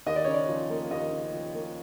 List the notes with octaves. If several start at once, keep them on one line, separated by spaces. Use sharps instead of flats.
D#2 D#5
D5
C#3 C#5
D5
F3
A#3
D#2 D#5
C#3
F3
A#3